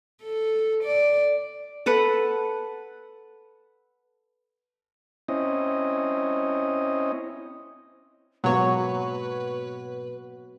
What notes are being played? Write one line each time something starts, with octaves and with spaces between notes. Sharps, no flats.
A4
D5
A4 B4 F#5
C4 C#4 E4 D#5
G#2 B2 F#3 A#3 B3 F#4 B4 C#5